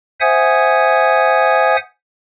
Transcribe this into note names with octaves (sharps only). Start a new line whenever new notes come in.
C5 E5 F#5 G#5 D#6 G#6